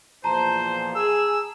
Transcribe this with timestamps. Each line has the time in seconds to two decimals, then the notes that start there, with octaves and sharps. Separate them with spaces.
0.24 E2 A#2 F3 C5 A5 A#5
0.96 G#4 E6